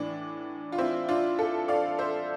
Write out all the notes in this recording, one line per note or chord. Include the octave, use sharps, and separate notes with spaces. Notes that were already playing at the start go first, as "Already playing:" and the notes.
Already playing: A2 E3 D4
F4
C4 E4
D4 F4
F4 A4
D5 F5
C5 E5